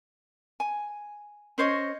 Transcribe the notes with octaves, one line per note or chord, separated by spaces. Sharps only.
G#5
C#4 C5 C#5 D#5